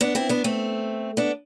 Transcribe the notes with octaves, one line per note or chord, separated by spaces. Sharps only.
B3 D4
C4 E4
B3 D4
A3 C4
B3 D4